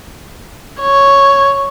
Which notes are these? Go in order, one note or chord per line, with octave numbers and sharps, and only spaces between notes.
C#5